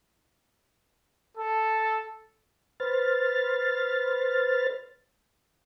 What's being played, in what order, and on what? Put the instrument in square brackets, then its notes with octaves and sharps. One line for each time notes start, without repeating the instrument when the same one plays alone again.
[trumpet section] A4
[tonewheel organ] B4 C5 F6 A6